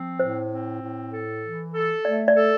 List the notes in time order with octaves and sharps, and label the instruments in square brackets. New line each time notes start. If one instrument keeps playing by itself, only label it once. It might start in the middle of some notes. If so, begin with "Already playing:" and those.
Already playing: [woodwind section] F3 C4
[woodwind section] A2 [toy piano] C5
[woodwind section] C4
A2
A4
E3
A4
[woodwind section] A3 [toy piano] D5
[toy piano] D5
[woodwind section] A4